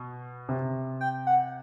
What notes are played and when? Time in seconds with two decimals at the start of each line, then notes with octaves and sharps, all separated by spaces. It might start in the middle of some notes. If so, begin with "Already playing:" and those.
Already playing: B2
0.49 C3
1.01 G5
1.27 F#5